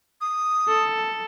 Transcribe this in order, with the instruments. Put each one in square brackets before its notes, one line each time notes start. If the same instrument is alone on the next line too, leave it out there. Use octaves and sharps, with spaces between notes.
[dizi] D#6
[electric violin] A4